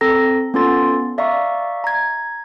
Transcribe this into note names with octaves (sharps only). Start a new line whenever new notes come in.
C4 A4 A#5 A#6
B3 C#4 F4 A4 C6 A6
D5 E5 F5 A#5 C#6
A#5 G#6